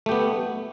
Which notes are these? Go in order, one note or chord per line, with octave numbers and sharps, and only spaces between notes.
A3 B3 G4